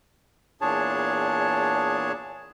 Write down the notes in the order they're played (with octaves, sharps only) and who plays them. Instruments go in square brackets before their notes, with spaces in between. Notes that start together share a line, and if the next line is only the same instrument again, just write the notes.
[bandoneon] E2 A#2 D4 G#4 C#5 A5